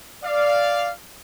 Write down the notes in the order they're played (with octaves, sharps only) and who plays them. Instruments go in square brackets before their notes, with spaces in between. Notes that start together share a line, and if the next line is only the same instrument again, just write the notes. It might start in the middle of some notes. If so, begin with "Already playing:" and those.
[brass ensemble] D5 [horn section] F5